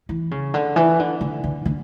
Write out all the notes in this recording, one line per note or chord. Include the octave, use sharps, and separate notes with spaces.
E3
C#3
D3
E3
D3
D3
D3
D3